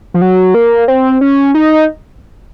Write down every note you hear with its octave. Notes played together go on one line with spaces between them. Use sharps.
F3
F#3
A#3
C4
C#4
D#4